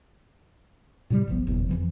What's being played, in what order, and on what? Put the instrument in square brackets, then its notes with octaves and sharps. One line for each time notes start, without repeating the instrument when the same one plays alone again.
[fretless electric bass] A2 C3 F#3 G3
G1 C2 F3 B3
F#1 E2 B2
F2 E3 F3